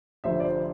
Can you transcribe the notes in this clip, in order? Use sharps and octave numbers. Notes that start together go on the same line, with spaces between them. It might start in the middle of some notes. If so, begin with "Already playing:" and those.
F1 F2 D3 C5 E5
D5
C5